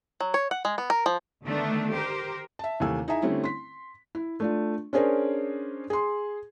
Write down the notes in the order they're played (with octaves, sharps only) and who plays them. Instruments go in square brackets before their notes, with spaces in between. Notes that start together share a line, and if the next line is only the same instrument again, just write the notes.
[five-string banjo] F#3
C#5
F#5
G#3
B3
A#4
F3
[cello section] D3 D#3 A3 B3 D4
G4 A#4 C5
[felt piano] E5 A5
D#2 C3 E3 A3 G#5 E6
D#4 E4 G#4 E5 G#5 A#5
D3 G3 A3 C4 C#4 E4
C6 B6
E4
A3 D4 F4
C#4 D4 G#4 A#4 C5 C#5
G#4 C6